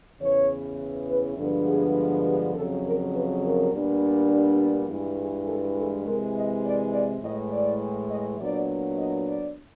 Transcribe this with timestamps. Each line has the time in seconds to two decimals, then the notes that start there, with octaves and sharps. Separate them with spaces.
0.21 E2 C#3 E3 C#5
1.09 B4
1.38 G2 D3 F3 G#3 B3 A4
1.67 G#4
2.26 G4
2.55 F2 C#3 F#3 A4
2.84 A#4
3.13 B4
3.43 A#4
3.71 A#2 G3 B3 D4
4.88 G2 E3 G#3
5.18 G#4
5.47 A4
5.76 A4
6.05 C3 E3 G#3 A#4
6.34 D#5
6.64 D5
6.93 D5
7.22 A2 E3 G#3 D#5
7.51 D5
8.09 D#5
8.40 A#2 F#3 B3 D4 D5
8.97 D#5
9.26 D5